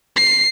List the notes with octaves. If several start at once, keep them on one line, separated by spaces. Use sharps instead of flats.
C7